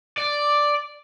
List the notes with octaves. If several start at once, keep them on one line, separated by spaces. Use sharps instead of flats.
D5